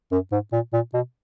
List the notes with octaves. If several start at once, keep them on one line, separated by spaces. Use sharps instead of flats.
F#2
G#2
A#2
A#2
B2